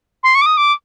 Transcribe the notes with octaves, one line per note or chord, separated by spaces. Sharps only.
C6
C#6
D6
D#6
D6